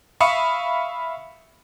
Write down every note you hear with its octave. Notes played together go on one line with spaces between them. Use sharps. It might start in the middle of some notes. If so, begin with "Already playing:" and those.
E5 F5 B5 C#6 D#6 C#7